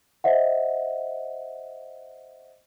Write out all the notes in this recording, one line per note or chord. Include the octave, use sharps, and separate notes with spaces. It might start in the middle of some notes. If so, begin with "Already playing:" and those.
C5 D#5 E5 F#5